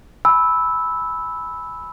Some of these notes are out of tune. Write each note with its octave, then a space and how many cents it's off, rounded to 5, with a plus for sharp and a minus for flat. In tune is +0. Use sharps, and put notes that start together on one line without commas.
G#5 +0 B5 +0 E6 -10